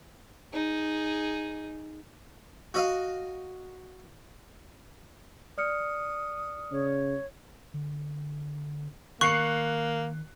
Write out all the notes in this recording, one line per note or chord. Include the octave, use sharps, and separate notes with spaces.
D#4 G#4
F#4 D#5 F5
D5 D#6 F6 C#7
C#3 C#5
D3
D#3 A#3 C#6 F#6 C7 C#7